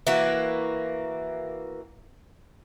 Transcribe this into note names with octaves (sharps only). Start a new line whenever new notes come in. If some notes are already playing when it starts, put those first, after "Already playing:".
E3 A#3 F#4